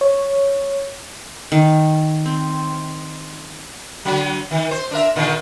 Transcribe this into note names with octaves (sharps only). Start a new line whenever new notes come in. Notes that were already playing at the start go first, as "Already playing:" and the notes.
C#5
D#3
C4
D3 F#3
D#3
C5
D4 A#4 E5
A#2 D3 D#3